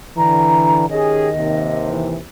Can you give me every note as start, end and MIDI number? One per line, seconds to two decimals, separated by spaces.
0.17 0.84 50
0.17 0.89 52
0.17 0.85 82
0.90 1.83 51
0.90 1.28 61
0.90 1.28 67
0.90 1.28 68
0.90 1.90 75
1.36 2.22 39
1.36 2.22 48
1.89 2.16 52